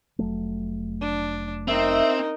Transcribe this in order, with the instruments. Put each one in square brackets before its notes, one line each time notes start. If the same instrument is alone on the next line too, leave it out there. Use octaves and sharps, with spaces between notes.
[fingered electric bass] F1 F#3 A3
[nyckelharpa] D4
[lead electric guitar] C4 [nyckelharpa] D#4 A#4 [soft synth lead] E5